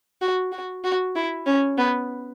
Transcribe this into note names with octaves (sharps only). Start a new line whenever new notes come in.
F#4
F#4
F#4
E4
C#4
B3